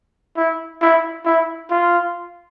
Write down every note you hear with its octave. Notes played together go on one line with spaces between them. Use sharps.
E4
E4
E4
F4